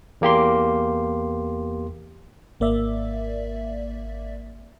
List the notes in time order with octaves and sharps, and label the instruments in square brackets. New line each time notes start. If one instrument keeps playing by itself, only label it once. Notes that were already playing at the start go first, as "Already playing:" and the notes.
[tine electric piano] E2 A#3 G4 C6
[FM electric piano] G#1 A#3 D5 E5